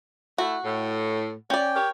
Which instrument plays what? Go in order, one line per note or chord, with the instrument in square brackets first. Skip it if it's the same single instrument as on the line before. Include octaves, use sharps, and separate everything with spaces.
[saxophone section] A3 E4 [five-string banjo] F#4
[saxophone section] A2
[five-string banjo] C#4 D5 [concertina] G5
[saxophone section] G4 A#4 C#5